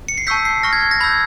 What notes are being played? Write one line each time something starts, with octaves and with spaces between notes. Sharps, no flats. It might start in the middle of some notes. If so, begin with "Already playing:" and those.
C#7
C7
A5 C#6 E6 G6 B6
C7
C#6 F6 A#6
G#6
A#6
B5 E6 G6 G#6